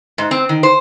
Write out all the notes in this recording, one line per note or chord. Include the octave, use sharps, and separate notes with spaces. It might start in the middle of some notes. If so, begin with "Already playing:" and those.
G#2
C4
D#3
C5